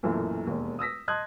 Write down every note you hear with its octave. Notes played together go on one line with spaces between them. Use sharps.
B1 F#2 A#2 E3 A3
E1 D#2
D#6 E6 A#6 B6
D#5 A5 C6 D#6 F#6 G#6